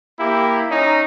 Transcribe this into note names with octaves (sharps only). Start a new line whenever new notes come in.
A#3 E4 G4
C#4 D#4 A#5